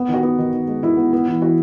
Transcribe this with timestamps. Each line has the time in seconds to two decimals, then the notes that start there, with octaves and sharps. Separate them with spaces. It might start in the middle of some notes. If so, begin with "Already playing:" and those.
Already playing: B3
0.09 D#3
0.14 F#4
0.23 B3
0.38 D#3
0.53 D#3
0.68 G#3
0.82 D#3 E4
0.97 B3
1.13 B3
1.28 E3
1.42 E3 F#4